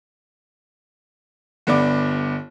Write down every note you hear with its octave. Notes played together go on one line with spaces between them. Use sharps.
G1 B3 D4 D6